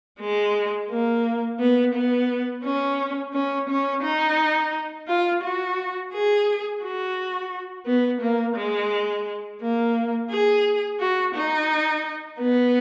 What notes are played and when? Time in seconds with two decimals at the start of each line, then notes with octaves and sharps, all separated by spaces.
0.20 G#3
0.90 A#3
1.60 B3
1.94 B3
2.64 C#4
3.34 C#4
3.69 C#4
4.03 D#4
5.08 F4
5.43 F#4
6.13 G#4
6.83 F#4
7.86 B3
8.21 A#3
8.57 G#3
9.61 A#3
10.31 G#4
11.00 F#4
11.35 D#4
12.39 B3